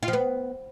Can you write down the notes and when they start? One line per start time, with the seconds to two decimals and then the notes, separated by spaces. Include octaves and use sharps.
0.03 F4
0.08 F3
0.13 B3